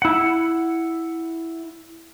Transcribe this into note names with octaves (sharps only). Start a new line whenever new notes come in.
E4 F#5